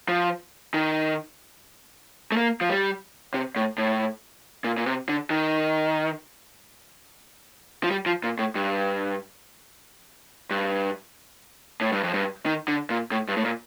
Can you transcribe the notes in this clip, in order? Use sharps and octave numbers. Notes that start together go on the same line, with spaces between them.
F3
D#3
A3
A#3
F3
G3
C3
A2
A2
A#2
A#2
C3
D3
D#3
F3
G3
F3
A#2
A2
G2
G2
A2
G2
F2
G2
D#3
D3
A#2
A2
G2
A2
A#2